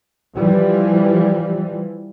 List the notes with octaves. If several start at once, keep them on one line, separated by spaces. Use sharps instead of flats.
E3 F3 G3